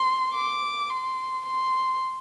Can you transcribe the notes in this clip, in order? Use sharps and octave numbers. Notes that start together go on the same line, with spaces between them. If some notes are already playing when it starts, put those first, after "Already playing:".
Already playing: C6
D6
C6
C6